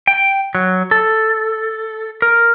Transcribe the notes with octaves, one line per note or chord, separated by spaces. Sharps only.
G5
F#3
A4
A#4